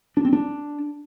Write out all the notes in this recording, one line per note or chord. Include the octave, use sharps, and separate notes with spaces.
D4
C4
D4